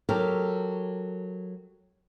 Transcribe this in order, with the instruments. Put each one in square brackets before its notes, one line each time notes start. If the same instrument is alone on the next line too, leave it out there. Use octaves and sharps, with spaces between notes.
[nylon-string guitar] F#3 G4 A4 A#4